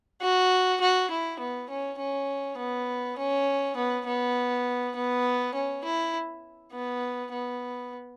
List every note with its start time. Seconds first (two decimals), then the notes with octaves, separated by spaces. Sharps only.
0.22 F#4
0.81 F#4
1.11 E4
1.40 B3
1.70 C#4
1.99 C#4
2.58 B3
3.18 C#4
3.76 B3
4.06 B3
4.96 B3
5.55 C#4
5.84 E4
6.72 B3
7.32 B3